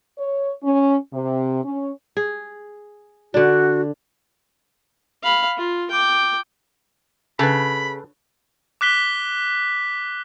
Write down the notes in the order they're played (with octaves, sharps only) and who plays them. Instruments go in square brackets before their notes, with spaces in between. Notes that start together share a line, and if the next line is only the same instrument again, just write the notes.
[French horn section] C#5
C#4
C3
C#4
[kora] G#4
[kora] D3 D4 [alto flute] F#4
[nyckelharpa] F5 B5
F4
G5 D6
[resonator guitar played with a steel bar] C#3 [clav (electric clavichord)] A4 B4 [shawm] B5
[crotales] D6 F#6 B6 G7